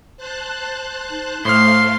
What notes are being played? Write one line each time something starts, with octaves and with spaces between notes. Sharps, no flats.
C5 A5 F#6
D#4
A2 A3 C5 F5 C6 F6